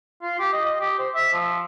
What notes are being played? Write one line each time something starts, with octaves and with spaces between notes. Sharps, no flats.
F4
G4
D#5
D#5
G4
C5
E5
F3